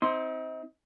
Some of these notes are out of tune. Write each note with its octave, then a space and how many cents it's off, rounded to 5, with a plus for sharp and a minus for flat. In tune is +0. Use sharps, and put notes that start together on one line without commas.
C4 +0 D#4 +40 C6 +0